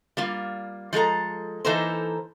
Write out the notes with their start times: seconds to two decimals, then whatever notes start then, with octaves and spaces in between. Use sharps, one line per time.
0.17 G3 A#3 F4
0.93 F3 G#3 A4 A#5
1.65 E3 A#3 D#4 A4 A#4 C5